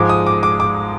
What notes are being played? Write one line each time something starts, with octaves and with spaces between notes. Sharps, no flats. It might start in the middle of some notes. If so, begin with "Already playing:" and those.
Already playing: G#2 F3 G#3 D6
D#6
D6
D6
D6